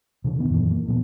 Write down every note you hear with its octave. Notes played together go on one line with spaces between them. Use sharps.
C3 E3 D4
F1 D#3 B3
F#2 A#2 D#3 E3
A#3
A#2 F3 B3